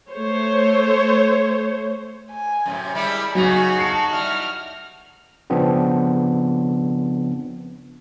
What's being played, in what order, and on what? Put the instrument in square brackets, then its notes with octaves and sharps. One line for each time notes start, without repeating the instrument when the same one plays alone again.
[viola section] A3 C5 C#5
[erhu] G#5
[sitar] F#2 A2 C3
[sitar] G3 G#3 E4 [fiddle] D5 E5 [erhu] B5
[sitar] C#3 B3 [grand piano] F#3 F7 [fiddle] D#4 F#4 [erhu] G#5
[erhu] A5 [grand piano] C7 C#7
[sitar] G3 E4 [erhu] F6
[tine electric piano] C#3 F3 B3 C4 D4